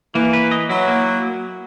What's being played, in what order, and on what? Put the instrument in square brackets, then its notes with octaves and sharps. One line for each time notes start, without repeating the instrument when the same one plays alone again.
[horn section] E3 [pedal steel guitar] A#3
[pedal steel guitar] B4
D#5
[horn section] F#3 [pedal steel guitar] E4
[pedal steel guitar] A#3